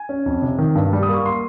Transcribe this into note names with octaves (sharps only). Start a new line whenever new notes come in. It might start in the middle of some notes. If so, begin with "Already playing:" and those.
Already playing: G#5
C#4
F2
C3
D#3
G2
G3
D#6
A#3 C#6
C6